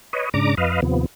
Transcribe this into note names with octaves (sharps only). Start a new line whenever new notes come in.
B4 C#5 D#5
G#2 C#3 D4 A#5 D6
F2 B4 D#5 F5
D#2 C3 F3 B3